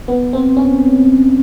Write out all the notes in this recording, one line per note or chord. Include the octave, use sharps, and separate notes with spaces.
B3
C4
C#4